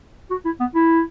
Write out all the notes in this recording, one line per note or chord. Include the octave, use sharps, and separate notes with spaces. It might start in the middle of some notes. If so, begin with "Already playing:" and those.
F#4
E4
B3
E4